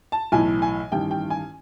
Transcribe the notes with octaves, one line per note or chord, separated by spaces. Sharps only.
A5
B1 A2 E3 G#5
G#5
A1 G2 D#3 G5
G5
G#5